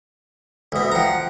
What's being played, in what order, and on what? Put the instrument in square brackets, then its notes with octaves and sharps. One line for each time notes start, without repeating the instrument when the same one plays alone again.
[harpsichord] D2 B2 [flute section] E5 D#6
[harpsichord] F3 A#5 [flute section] F#5 G5 F#6